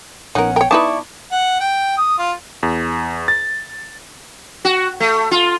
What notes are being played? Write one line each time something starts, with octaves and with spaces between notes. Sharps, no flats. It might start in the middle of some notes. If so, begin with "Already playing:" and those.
A#1 B3 C#4 D#4 A#4 F#5
A#4 C#5 G5
B3 D#4 E4 B4 D5 A5 C#6 D6
F#5
G5
D#6
F4
E2
A6
F#4
A3
F4